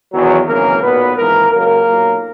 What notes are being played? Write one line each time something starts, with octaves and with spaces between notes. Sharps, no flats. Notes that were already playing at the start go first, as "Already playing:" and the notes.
E2 D#3 F#3
G#1 F#2 C#3 E3 A#3 A#4
B1 A#2 F#3 B3 B4
G#1 G#2 E3 A#3 A#4
C#2 C#3 F#3 A#3 A#4
B1 A#2 F#3